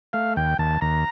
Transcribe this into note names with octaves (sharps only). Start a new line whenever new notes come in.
A3 F5
D#2 G5
D#2 A5
D#2 A#5